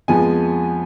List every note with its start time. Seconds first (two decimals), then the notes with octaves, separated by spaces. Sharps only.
0.08 F2 F3 G#3 B3 G#5